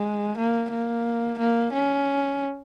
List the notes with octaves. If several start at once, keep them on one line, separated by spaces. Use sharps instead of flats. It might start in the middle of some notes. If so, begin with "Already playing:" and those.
Already playing: G#3
A#3
A#3
A#3
C#4